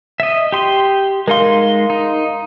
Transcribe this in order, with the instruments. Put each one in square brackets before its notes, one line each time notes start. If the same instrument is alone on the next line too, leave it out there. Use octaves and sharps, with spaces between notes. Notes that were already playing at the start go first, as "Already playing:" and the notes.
[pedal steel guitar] D#5 E5
G4 C6
[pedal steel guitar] G#3 D#4 C6 [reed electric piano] A#4 F5
[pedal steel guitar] D#4